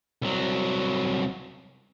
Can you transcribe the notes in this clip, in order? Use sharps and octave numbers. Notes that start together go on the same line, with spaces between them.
C2 F#3